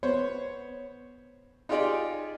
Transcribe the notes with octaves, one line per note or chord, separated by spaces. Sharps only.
B3 C5 C#5
D#4 F4 G4 G#4 D5 D#5